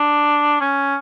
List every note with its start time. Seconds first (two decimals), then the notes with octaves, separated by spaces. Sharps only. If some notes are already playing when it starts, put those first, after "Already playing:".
Already playing: D4
0.61 C#4